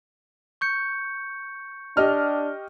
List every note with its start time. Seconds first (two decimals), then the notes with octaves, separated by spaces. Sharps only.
0.61 C#6 G6 C#7
1.97 D4 G4 D#5 F6